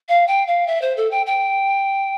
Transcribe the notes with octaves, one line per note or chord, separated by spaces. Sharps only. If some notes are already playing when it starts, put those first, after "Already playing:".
F5
G5
F5
E5
C5
A4
G5
G5